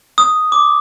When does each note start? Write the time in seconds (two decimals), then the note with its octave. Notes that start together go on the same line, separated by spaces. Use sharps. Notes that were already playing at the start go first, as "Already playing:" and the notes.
0.18 D#6
0.52 D6